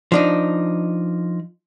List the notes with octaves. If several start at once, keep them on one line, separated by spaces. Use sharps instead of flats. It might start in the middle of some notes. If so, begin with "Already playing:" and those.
F3 D4 D#4